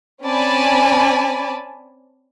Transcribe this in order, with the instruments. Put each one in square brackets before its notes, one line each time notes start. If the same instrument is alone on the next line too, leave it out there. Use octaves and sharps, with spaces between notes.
[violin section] C4 C#4 D5 G#5 A5 B5